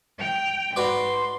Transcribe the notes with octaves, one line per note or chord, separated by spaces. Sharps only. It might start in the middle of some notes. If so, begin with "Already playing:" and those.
G5 F7
G#2 F#4 B4 D5 C6